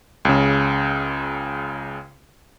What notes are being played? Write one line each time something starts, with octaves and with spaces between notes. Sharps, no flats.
C#2 C#3